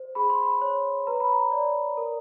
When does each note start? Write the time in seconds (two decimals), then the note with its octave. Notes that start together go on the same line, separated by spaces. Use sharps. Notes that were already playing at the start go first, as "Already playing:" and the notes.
Already playing: C5
0.15 G#4 B5
0.30 C6
0.43 B5
0.62 C#5
1.07 B4 A#5
1.20 B5
1.33 A#5
1.52 D5
1.97 A#4